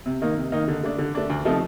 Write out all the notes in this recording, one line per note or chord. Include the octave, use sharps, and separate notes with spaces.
C3
D#3 A#3 D#4
C3
D#3 A#3 D#4
D3
A3 D4
D3
A3 D4
D2
C3 F3 A3 D#4